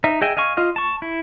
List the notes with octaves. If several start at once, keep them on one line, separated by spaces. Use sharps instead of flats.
D#4 E5
G#4 D#5 E5 G5 G#5
D#5 F5 G#5 C#6
F4 D#5 F5
A5 C#6
E4